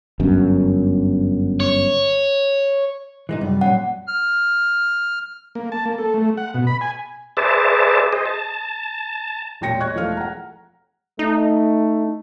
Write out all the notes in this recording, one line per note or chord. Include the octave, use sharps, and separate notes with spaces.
G1 F#2
C#5
E3 G#3 D#4
F#2 C3 G3
A#2 F#3 C#4 F#5
F6
A#3
A5
A#3
A4
A3
F#5
B2
B5
G#5
G#4 B4 C5 D5 E5 A5
G#4 C5 D#5
A5
E1 A#2 C#5 G5 A#6 C#7
C#5 D#5 C#6 F#6 G#6
E1 E3 F3 A3 F5 F6
F#5 A#5
A3 D#4